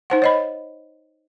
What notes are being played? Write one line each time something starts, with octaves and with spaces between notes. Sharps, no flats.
D#4 C5 F#5
C#5 D#5 B5